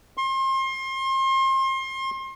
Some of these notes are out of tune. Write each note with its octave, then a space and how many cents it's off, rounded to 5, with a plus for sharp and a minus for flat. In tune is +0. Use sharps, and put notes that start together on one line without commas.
C6 +35